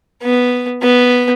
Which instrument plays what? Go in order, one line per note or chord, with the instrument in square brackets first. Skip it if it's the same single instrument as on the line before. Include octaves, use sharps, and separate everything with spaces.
[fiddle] B3
B3